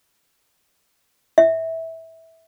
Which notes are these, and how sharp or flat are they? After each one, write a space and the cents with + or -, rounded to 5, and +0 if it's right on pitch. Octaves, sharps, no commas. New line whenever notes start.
E5 -15